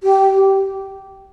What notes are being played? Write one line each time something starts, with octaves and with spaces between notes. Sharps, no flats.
G4